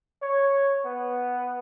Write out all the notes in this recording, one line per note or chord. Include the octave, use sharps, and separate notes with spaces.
C#5
B3